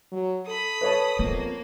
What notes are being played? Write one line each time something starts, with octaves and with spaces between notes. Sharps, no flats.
F#3
A4 B5 D#6
A4 B4 C#5 A5
F2 A#3 B3